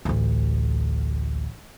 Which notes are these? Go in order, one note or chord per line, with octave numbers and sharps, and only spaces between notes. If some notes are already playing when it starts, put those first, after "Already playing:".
A1 D2